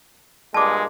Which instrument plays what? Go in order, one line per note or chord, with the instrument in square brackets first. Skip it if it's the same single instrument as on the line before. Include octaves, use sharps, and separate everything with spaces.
[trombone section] G2 A#2 G#3 [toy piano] A5 D6